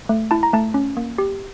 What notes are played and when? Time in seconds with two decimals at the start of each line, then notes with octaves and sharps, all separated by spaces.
0.09 A3
0.31 E4 A5
0.43 A#5
0.53 A3 A5
0.74 C#4
0.97 A#3
1.18 G4